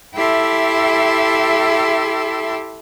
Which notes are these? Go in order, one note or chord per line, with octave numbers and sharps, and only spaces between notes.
E4 G4 A4 E5 C6